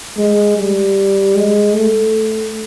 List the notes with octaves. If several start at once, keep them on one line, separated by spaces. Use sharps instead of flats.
G#3
G3
G#3
A3